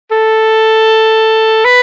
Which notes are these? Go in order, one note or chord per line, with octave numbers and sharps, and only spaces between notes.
A4
B4